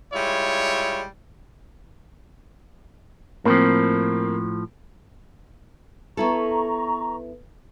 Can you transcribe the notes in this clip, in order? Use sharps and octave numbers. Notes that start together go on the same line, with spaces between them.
G3 G#3 E4 F4 C#5
A2 F3 A#3 C4
B3 E4 A4 A#5 C#6